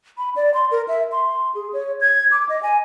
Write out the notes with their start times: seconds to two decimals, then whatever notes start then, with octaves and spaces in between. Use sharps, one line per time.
0.18 B5
0.36 D5
0.54 C6
0.71 A#4
0.88 E5
1.12 C6
1.55 G#4
1.73 C#5
2.01 G#6
2.32 D6
2.49 D#5
2.63 G#5